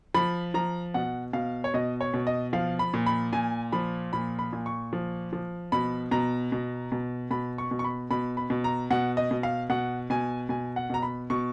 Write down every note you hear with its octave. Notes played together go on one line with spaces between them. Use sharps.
F3 B5
F3 A#5
B2 F#5
B2 F5
C#5
B2 D#5
C#5
B2
D#5
F3 F5
B5
A#2
B5
A#2 G#5
F3 B5
A#2 B5
B5
A#2
C#6
F3
F3
B2 B5
B2 A#5
B2
B2
B2 B5
C#6
B2
C#6
B5
B2 B5
B5
B2
A#5
B2 F#5
D#5
B2
F5
B2 F#5
B2 G#5
B2 G#5
F#5
B2 A#5
B5
B2 C#6